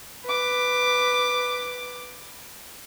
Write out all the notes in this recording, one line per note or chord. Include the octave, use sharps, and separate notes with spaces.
B4 D6